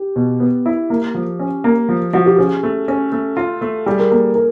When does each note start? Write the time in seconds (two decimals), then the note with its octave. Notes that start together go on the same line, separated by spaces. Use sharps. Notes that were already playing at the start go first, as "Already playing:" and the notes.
Already playing: G4
0.16 B2
0.40 B3
0.66 E4
0.90 A#3
1.15 F3
1.39 C#4
1.64 A#3
1.89 F3
2.13 F3 F#4
2.26 G4
2.38 C#4 G#4
2.63 A3
2.88 C#4
3.12 A3
3.37 F4
3.61 A3
3.86 G3 G#4
3.99 A#4
4.11 A#3 A4
4.35 A#4